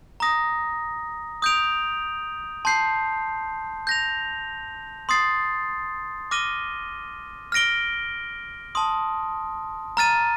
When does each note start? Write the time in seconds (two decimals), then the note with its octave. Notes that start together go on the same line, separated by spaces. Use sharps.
0.20 A#5 D#6 A#6
1.42 D#6 G6 D7 F7
2.65 A5 C6 G6 C7
3.87 G6 A#6 F7
5.09 C6 D#6 A6 C7
6.31 D6 F6 A#6 D#7 G7
7.52 F6 A#6 D7 G7
8.75 A5 C6 D#6
9.97 A#5 F6 A6 D#7